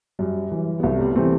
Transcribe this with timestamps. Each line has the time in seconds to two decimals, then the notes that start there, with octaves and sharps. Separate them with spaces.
0.19 F#2 G3
0.52 E3
0.80 B3
0.83 C2 F#3 A3
0.99 G3 B3
1.16 C3 E3 A3 C4